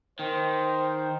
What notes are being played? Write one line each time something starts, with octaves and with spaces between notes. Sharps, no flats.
D#3 C5 G5